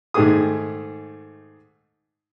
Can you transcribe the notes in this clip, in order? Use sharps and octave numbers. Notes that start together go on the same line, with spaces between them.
G#2 D#3 A3 G4 G#4 D#6